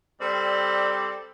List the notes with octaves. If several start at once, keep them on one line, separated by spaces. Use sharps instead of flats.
G3 C4 A4 D5